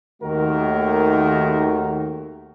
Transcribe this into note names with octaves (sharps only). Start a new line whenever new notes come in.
D#2 D#3 A3 F#4 A#4